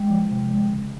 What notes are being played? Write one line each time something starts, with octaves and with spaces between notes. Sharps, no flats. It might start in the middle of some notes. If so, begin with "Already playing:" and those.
Already playing: G#3 G5
F3
C3
G#3
C#3